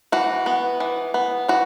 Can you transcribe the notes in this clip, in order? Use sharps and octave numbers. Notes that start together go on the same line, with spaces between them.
E3 F#4
B3
E3
B3
E3 F#4